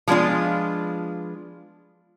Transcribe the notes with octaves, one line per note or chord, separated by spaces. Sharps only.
F3 G#3 B3 D4 F4